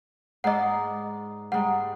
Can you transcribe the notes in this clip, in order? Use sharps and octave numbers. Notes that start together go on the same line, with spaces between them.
G#2 D#4 D5 D#5 F#5
G#2 G3 F#5